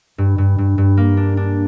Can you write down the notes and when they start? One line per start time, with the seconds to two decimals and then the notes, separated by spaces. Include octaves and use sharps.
0.18 G2
0.38 G2
0.58 G2
0.78 G2
0.97 A#3
1.17 D4
1.37 D4